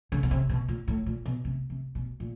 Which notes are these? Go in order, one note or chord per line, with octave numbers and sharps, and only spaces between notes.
C#3
B2
C3
B2
A#2
A2
A#2
B2
C3
C3
B2
A#2